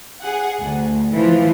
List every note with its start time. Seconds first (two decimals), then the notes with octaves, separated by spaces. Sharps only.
0.21 G#4 F#5
0.62 D2
1.12 E3 F3